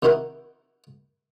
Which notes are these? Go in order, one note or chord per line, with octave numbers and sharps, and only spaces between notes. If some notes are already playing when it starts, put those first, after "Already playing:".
C3 D#3 D#4 E4 F#4 A#4